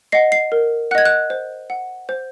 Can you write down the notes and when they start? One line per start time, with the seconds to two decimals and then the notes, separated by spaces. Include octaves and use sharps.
0.12 D#5 F#5 C7
0.32 C7
0.52 A#4
0.91 F#5 F#6
0.95 D#5 G#6
1.05 F#6
1.30 C5
1.70 F#5
2.09 C5